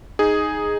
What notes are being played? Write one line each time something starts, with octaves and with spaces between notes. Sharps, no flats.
D#4 G#4